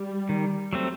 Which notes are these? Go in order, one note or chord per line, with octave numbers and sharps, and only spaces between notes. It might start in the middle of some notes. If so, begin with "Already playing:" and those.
Already playing: G3
D#3
F#3 A3 C4